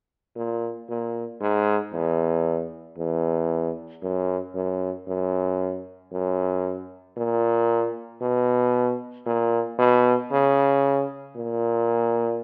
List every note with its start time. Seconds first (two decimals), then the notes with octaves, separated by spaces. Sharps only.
0.36 A#2
0.88 A#2
1.41 G#2
1.93 E2
2.98 E2
4.03 F#2
4.55 F#2
5.07 F#2
6.12 F#2
7.17 A#2
8.21 B2
9.26 A#2
9.78 B2
10.31 C#3
11.36 A#2